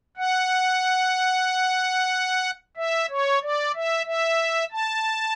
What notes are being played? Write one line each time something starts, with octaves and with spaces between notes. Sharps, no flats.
F#5
E5
C#5
D5
E5
E5
A5